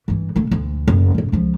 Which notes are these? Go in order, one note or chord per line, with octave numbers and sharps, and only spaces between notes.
G2 E3
D3 A3
D2 D3
F#1
F#1 C#4
C#2 F3